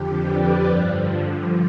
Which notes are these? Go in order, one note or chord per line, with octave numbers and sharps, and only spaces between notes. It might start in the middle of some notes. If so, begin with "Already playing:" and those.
Already playing: F2 D3 F3 G4
B4 D5
G2 D3 F3